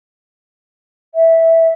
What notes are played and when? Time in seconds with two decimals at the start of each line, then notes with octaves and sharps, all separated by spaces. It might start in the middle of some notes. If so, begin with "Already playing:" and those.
1.14 E5